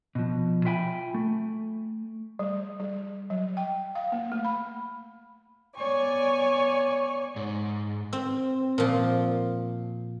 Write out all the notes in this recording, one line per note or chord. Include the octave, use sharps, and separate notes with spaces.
B2 F3
F4 E5 G5 G#5 B5
A3
G3
G3
F#3
G5
F5
A#3
A3
B5
B3 C#5 D5 G#5 C#6
G#2
C4
A#2 F3